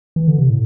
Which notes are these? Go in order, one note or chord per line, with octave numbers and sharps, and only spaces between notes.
E3
D3
C3
A2